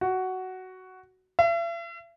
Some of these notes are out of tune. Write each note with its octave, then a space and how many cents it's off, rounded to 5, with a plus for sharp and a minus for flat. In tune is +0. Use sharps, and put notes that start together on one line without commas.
F#4 +10
E5 +45